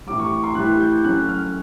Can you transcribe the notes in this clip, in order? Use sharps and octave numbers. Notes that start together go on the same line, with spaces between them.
A2 E3 G3 D6
C#6
C6
A2 E3 G3 F#6
G6
F#3 A3 C#4 F#6
F6